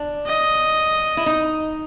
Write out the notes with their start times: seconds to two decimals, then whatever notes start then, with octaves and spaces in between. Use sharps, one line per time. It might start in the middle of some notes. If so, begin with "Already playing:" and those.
Already playing: D4
0.27 D#5
1.17 E4
1.26 D#4